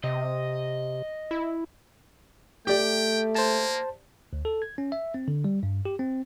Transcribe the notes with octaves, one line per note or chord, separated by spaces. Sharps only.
C3 D#5
E4
A3 G4 D5 G5
A#3 C5 A5
D2
A4
G#6
C#4
E5
C4
D3
G3
G2
G4
C4